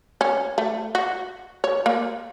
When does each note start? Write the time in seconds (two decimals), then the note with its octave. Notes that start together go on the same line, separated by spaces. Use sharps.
0.21 C#4
0.58 A3
0.95 F#4
1.64 C#5
1.86 A#3